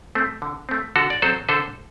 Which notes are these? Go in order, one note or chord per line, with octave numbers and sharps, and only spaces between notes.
A3 C4
D3
A3 C4
D3 F#4 A4
D5
F#3 C4 A4 C5
D3 A4 C5